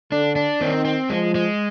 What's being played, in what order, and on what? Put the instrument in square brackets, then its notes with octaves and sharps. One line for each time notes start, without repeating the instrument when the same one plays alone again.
[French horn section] D3 [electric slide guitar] D4
[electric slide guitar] D4
[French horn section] D#3 [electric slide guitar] C4
[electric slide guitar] C4
[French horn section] F3 [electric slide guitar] G#3
[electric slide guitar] G#3